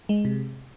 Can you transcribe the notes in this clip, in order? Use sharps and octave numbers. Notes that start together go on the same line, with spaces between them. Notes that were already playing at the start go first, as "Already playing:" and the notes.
G#3
C3